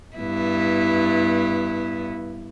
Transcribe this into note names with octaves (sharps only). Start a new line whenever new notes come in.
G2 B3 E4